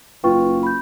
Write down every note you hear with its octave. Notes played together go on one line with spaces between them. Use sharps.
F#1 F4 B4 G5 C#6
B5 G6